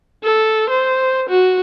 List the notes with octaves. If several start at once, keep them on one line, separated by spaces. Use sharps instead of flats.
A4
C5
F#4